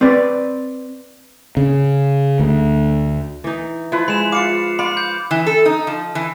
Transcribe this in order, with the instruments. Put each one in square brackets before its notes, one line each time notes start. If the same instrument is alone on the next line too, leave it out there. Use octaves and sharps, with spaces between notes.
[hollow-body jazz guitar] C4 B4 D5
[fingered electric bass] C#3
D2
[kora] E3 D#4
[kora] F3 [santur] E4 B4
[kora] G#3 [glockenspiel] B5 E7
[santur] F4 F5 [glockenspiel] D6 C#7
[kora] F4 [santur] F5 D6 [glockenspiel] B5
[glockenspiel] G6
[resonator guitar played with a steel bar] E3
A4
D#4
F3
E3